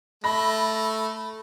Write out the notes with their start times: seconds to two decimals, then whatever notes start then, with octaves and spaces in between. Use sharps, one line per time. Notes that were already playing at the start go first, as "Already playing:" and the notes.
0.24 A3 B5 A#6